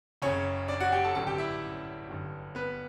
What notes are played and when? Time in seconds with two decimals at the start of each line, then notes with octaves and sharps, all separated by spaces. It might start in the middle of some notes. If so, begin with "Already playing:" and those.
0.22 F#1 F#2 C#3 C#4 C#5
0.68 D4 D5
0.80 F#4 F#5
0.92 G4 G5
1.04 A4 A5
1.15 A1 G2 D3 F#3 A4 A5
1.27 G4 G5
1.38 E4 E5
2.08 G1 G2 F#3
2.55 B3 B4